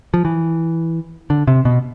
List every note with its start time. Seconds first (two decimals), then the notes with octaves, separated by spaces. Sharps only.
0.14 F3
0.25 E3
1.30 D3
1.47 C3
1.65 B2